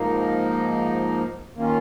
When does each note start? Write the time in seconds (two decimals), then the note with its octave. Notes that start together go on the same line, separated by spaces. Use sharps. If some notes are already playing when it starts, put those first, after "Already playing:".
Already playing: G#2 F3 A#3 D#4
1.56 D#3 A#3 C#4 F4